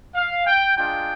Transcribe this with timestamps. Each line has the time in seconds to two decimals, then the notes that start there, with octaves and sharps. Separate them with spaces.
0.15 F5
0.46 G5
0.76 G#3 D4 F4 G5